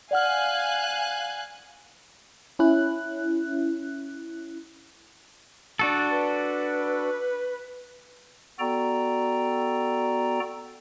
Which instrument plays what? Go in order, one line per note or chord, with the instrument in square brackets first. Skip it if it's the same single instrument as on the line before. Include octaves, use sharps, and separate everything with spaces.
[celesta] D5 F#5 F6 [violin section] F5 G#5 F#6
[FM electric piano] C#4 E4 F#6
[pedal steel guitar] D4 F#4 A4
[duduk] B4
[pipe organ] B3 F#4 A4 D5 G5 A#5